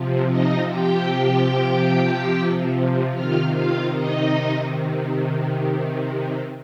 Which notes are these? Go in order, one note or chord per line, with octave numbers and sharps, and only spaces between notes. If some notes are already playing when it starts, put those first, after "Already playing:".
Already playing: C3 F3
D#4 D#5
G4 G5
C3 D#3 F4 F5
F4 F5
D#4 D#5